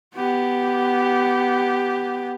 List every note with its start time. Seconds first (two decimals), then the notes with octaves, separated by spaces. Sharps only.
0.15 B3 G4